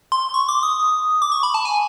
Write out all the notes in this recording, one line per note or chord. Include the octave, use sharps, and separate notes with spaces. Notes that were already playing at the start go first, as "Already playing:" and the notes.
C6
C#6
D6
D#6
D6
C#6
B5
A5
G#5